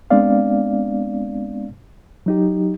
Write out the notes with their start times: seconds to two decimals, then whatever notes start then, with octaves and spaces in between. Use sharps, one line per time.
0.10 G#3 B3 C4 D4 D5 F5
2.26 F#3 D#4 G4